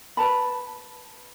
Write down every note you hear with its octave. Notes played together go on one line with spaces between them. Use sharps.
B4 A5 B5